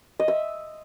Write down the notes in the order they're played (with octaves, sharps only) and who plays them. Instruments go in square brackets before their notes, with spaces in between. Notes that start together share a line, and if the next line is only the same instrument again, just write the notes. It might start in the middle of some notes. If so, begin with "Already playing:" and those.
[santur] D#5
E5